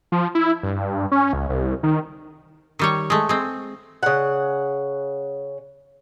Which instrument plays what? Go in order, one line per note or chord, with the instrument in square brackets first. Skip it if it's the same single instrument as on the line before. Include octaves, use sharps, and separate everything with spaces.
[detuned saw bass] F3
E4
G2
C#4
C#2
C2
D#3
[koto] D#3 G3 C#5
G#3 A3
G#3 C4
[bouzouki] C#3 F#5